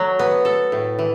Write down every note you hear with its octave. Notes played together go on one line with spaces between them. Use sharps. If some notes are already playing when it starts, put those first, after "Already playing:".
Already playing: F#3 A3
B3
A4
A2
E3